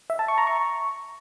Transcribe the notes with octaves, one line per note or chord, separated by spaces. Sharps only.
E5
A5
C#6
A#5
C#6